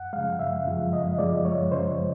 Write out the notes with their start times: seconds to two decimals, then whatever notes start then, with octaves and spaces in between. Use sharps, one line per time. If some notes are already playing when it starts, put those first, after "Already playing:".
Already playing: F#2 F#5
0.13 C#3 F3 G#3 F5
0.39 F#2 E5
0.65 C#3 F3 G#3
0.92 F#2 D#5
1.19 C#3 F3 G#3 D5
1.45 F#2 C#5
1.71 C#3 F3 G#3 C5